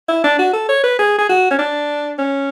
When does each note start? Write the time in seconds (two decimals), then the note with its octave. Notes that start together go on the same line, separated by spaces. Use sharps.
0.08 E4
0.24 D4
0.39 F#4
0.53 A4
0.69 C#5
0.84 B4
0.99 G#4
1.18 G#4
1.29 F#4
1.51 C#4
1.59 D4
2.19 C#4